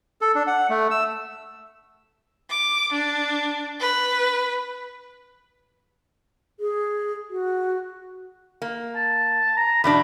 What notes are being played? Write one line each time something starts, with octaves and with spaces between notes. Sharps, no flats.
A4
D4
F#5
A3
E6
D6
D4
B4
G#4
F#4
A#3
A5
A#5
E2 B2 D4 B5